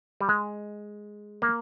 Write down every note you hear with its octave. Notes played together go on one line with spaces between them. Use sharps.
G3
G#3
A#3